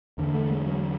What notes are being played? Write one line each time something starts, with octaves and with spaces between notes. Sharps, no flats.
E2 D3
A3
G#3
F#3